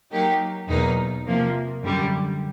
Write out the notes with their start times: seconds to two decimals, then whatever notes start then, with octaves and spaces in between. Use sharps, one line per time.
0.12 F#3 A#3 D#4 G4
0.68 E2 B2 F#3 A#3 D#4
1.26 C3 F3 A#3
1.84 F#2 D3 G3